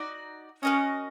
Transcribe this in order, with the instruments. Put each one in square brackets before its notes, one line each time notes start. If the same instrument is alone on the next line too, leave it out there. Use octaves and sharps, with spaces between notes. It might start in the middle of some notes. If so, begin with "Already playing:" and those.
Already playing: [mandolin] D#4 F#4 D5
[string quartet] C#4 [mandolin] F#4 A#4 D#5